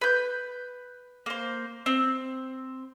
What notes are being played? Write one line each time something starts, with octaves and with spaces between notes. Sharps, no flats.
B4 G6
A#3 C5
C4